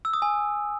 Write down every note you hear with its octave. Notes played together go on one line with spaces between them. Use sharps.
E6
D#6
G#5